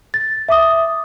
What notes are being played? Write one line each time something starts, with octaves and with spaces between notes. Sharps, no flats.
A6
E5 D6 D#6